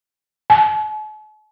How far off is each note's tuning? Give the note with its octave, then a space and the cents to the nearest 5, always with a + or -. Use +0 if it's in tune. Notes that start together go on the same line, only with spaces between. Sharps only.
A5 -45